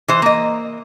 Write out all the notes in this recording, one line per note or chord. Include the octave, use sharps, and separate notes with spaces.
E3 C5
A#3 D#5